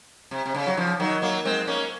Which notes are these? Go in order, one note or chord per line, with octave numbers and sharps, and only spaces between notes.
C3
C3
C#3
F#3
C#3 F3
D#3 F#3
F#3 A#3
G#3 C4
A#3 C#4